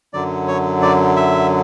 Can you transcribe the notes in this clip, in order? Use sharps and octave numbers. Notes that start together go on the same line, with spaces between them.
F#2 D3 F#3 D5
C#5
D5
E5